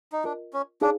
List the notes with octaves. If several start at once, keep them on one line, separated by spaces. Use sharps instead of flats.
D#4
D4 F4 A#4 D#5
C#4
D4 D#4 G#4 C#5 F5 G#5